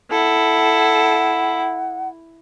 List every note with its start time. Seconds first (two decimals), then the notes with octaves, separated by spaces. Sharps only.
0.11 E4 A4 F#5